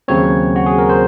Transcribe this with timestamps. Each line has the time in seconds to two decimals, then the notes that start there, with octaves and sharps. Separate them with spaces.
0.08 D#2 C#3 F#3 C4 C#5
0.56 F#4
0.66 G#4
0.78 A#4
0.89 C5